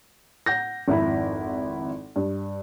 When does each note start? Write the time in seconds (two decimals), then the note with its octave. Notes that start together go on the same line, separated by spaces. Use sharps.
0.46 F#5 G6 A#6
0.88 G#1 F2 E4 B5
2.16 G2